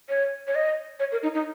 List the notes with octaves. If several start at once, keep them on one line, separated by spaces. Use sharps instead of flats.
C#5
C#5
D#5
C#5
A#4
D#4
D#4